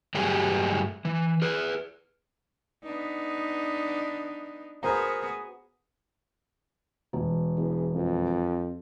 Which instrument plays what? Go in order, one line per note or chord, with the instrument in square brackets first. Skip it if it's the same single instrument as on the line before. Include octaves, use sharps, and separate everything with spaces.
[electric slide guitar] G2 F#3 G3 A3 G4 G#4
E3
G#4 B4
[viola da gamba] B3 D4 D#4
[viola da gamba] B3 F#4 G#4 [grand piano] A#4 C5 A#5
[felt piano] E1
[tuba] E2
F2